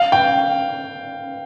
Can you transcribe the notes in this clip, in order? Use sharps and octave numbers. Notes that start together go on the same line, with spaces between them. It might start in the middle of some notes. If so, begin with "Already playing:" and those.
Already playing: F5
G5